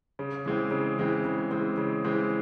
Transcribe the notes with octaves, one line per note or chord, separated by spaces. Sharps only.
C#3
E3 G#3 C4
C#3
E3 G#3 C4
C#3
E3 G#3 C4
C#3
E3 G#3 C4